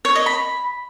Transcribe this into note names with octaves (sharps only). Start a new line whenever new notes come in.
C#5
D#5
B5